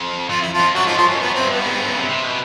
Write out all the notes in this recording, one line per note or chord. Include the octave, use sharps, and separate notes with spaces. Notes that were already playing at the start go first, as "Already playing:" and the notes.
Already playing: F2
F2 F4
E4
F3 F4
F2
F#2 F#3 F#4
G#2 F3 F4
F#2 F3 F4
F#2 C#4
F2
F#2 B3
C4
G2
B3
G#2
G2
F#2
C#3
C3
C3
B2